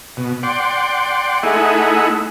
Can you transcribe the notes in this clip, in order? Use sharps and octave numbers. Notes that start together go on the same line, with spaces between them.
B2
D5 F#5 G5 C6
A3 D#4 E4 G#4 F#5